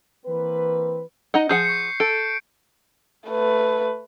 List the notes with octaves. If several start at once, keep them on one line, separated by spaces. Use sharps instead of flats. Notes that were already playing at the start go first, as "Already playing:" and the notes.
E3 A#3 C4 B4
D#4 D#5 F#5
F3 G#4 F#5 G6 C7 C#7
C#6 C#7
A4 D7
A3 B4